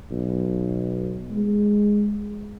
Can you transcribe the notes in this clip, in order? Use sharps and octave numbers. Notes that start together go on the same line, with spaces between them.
B1
G#3